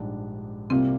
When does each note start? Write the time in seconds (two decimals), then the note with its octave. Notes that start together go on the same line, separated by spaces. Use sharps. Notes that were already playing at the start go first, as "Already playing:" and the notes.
Already playing: A#1 G#2 G3 D4
0.70 C2 C3 G3 A#3 C4 F4